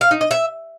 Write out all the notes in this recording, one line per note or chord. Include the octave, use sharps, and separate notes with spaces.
F5
D#4
D#5
E5